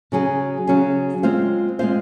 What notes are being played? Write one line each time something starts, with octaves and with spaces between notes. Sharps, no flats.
C#3 F#3 C#4 G#4
C#3 F#3 C#4 G#4
G#3 C4 F4 C5 F5
G#3 C4 F4 C5 F5